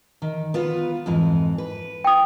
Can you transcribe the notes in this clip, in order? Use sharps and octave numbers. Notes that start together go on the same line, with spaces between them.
D#3
B3 F4 B4
F2 G#2 E3
B4
G5 D#6